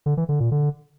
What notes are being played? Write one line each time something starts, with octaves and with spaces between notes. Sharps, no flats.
D3
E3
D3
A#2
D3